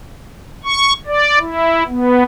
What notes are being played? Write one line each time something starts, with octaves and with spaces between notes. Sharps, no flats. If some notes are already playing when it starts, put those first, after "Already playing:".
C#6
D5
E4
B3